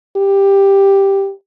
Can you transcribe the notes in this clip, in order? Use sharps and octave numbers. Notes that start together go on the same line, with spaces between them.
G4